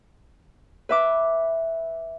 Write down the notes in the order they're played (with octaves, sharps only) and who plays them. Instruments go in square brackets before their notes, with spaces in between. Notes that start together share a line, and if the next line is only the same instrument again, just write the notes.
[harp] B4 E5 D6